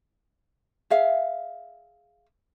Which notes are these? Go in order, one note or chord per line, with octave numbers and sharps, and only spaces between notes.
G#4 E5 F5